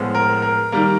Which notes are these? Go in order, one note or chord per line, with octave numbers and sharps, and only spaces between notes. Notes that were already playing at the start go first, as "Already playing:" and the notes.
Already playing: A2 F3 G#3 B3
A#4
A#4
D#3 G3 A#3